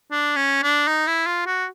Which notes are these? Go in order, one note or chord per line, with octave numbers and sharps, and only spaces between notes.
D4
C#4
D4
D#4
E4
F4
F#4